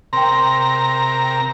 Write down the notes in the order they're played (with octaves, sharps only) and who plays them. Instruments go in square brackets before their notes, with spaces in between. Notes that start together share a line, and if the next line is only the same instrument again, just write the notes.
[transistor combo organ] C3 A#4 A#5 [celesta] G5 C6